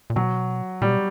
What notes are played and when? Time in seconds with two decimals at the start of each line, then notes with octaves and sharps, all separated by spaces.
0.10 A#2
0.16 B2 F#3
0.81 A#2 G3
0.89 B2